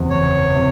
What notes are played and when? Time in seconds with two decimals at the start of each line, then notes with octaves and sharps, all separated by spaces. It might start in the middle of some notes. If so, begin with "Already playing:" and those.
Already playing: F#1 E2 C3
0.10 F#1 C#5
0.55 C3